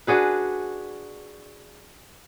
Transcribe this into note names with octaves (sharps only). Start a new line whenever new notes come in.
D4 F#4 G#4 B4